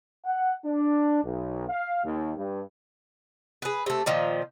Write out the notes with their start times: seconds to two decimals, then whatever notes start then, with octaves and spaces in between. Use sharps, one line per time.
0.25 F#5
0.65 D4
1.23 B1
1.69 F5
2.04 D#2
2.37 G2
3.62 G#4 B4
3.86 C3 A3
4.06 A#2 D#3 F3